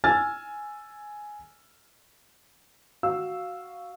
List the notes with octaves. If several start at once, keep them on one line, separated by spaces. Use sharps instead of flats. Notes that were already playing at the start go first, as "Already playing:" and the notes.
G#5 E6 F6 G#6 A6
F#4 F5 E6